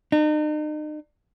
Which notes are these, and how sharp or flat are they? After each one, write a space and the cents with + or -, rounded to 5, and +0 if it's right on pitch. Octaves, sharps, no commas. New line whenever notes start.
D#4 -40